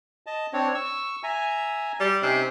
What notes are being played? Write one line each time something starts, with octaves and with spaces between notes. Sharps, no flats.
D#5 A5
C4 D4 C#5
C#6 E6
E5 G#5 A#5
G3
C3 C#4 D#4